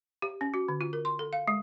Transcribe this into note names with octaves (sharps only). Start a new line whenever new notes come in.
G4
C#4
F#4
D3
F4
A#4
C6
A4
F5
G#3